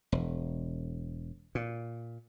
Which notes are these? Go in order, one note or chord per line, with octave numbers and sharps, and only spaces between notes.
E1
A#2